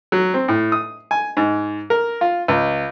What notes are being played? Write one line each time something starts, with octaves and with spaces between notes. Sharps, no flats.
F#3
C4
A2
D#6
G#5
G#2
A#4
F4
C#2